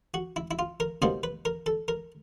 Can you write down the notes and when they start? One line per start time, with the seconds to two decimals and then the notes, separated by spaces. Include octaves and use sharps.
0.14 F#4
0.36 E4
0.51 E4
0.59 F4
0.80 A#4
1.02 C2 B2 G3 A#3 C5
1.23 B4
1.45 A#4
1.66 A4
1.88 A#4